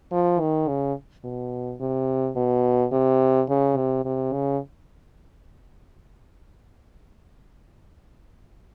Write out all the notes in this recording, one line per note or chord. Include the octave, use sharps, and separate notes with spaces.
F3
D#3
C#3
B2
C3
B2
C3
C#3
C3
C3
C#3